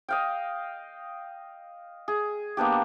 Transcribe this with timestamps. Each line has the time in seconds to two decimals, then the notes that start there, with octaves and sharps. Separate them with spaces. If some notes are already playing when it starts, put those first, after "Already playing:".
0.09 D#5 F5 G5
2.08 G#4
2.57 A#3 B3 D4 G4